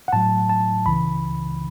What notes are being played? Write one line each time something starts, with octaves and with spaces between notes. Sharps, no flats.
F#5
A2 F#3 A5
A5
C#2 C#3 E3 B5